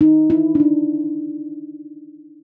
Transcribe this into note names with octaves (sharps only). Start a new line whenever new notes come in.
D#4
E4
D4
D#4